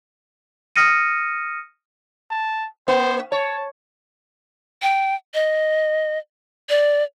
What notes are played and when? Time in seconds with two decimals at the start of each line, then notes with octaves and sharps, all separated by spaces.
0.76 D#6 F6 A#6 C#7 D#7
2.31 A5
2.88 A#3 C5
3.32 C#5 A5
4.82 G5
5.34 D#5
6.69 D5